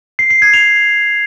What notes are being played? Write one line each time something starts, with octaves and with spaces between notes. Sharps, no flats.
C7
C7
G#6
F7